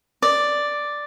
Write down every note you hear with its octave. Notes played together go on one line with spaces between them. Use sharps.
D5